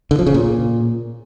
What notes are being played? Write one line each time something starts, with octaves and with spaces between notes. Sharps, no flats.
D3
F3
C#3
A#2